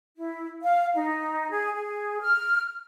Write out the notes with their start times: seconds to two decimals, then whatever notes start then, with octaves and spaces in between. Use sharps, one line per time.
0.17 E4
0.63 F5
0.95 D#4
1.50 G#4
1.73 G#4
2.21 F6